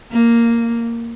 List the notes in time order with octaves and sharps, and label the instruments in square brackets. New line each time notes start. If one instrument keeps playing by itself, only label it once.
[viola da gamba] A#3